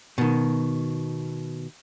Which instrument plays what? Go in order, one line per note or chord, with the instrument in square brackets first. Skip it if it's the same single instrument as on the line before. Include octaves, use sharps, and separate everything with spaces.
[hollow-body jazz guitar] B2 D#3